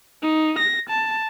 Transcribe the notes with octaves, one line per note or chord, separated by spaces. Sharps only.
D#4
A#6
A5